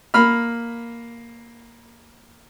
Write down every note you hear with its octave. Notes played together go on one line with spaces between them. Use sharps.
A#3 B5 F6